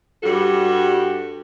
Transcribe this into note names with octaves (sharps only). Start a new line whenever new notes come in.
G2 G3 F#4 A4